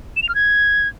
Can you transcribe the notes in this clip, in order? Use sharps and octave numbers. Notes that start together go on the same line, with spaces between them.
E7
F7
F6
G#6